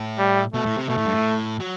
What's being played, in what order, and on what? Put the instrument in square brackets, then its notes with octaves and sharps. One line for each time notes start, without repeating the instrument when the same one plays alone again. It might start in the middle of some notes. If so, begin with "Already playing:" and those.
Already playing: [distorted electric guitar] A2
[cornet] G3
[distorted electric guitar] B2 [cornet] A3
[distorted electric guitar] A2
C3
[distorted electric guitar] B2 [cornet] A3
[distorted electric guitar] A2
G2
A2
F#3